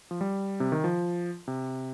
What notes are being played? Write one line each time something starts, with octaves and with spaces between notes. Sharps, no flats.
F3
G3
C3
D#3
F3
C3